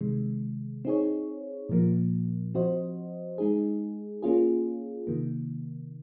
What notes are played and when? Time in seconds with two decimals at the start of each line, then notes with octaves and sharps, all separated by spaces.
0.01 C3 D#3 G#3
0.85 C4 D#4 G#4 C#5
1.69 A#2 F3 A#3
2.54 F3 C4 F#4 C5 D#5
3.38 G#3 D#4 G#4
4.23 A#3 C#4 F4 G#4
5.07 C3 D#3 A#3